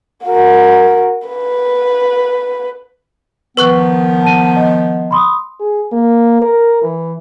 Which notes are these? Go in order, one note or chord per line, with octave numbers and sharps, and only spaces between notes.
F#4 A#4
B4
D#3 F3 B3 B4 C#6 F#6
A5 D#7
D#5
B5 C6 D#6
G#4
A#3
A#4
E3